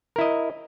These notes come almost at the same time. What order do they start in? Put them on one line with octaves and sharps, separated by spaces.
A#4 E4 D#5